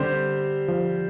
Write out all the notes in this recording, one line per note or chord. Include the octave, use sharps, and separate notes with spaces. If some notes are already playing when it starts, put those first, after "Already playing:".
Already playing: D3 G3 C4 G4 C5
F3